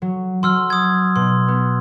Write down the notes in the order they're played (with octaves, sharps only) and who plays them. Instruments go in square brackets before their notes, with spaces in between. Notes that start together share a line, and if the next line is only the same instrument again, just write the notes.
[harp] F#3
[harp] F#3 [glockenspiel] C6 E6 F6
[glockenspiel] D#6 G#6
[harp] B2 [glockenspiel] C6
[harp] B3